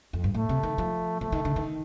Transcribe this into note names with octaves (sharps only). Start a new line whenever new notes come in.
F2
G2
A2 A3
C3
D#3
F3
F3 A3
D#3
D3
D#3